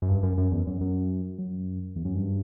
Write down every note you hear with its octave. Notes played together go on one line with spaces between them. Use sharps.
F#2
G2
F#2
F#2
E2
F#2
F#2
F#2
E2
F#2
G2